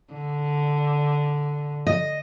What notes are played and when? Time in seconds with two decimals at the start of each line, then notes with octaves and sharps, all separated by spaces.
0.14 D3
1.87 D#5